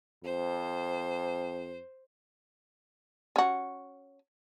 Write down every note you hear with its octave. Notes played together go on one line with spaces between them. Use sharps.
F2 C5
C#4 F#4